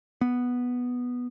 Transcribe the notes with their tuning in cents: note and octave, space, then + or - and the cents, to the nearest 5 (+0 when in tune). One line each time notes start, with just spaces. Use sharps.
B3 -5